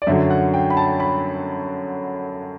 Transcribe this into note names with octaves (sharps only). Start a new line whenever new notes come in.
D5
F#2 D3 F#3 E5
F#5
G5
B5
A5
B5